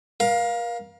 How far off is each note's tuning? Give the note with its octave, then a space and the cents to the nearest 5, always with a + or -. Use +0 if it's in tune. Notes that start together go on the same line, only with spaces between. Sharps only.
A#4 +35 F5 +10